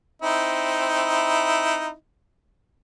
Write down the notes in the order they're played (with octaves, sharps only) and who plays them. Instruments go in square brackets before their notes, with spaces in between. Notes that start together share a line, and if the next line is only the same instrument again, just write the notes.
[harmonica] C4 D#4 E4